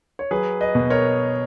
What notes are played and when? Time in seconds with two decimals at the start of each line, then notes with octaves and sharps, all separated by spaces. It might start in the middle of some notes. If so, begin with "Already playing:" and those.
0.19 C#5
0.31 F#3 G#4 B4
0.61 B4 D#5
0.75 B2
0.90 A#4 C#5